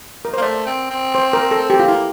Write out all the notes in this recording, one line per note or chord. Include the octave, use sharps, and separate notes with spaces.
A#4
C5
A#3
A3 D5
C4
C4
C5
A#4
A4
G4
F4
A#3 E4